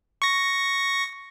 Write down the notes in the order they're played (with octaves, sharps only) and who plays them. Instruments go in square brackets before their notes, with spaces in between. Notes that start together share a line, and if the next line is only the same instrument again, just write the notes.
[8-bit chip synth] C#6 A#6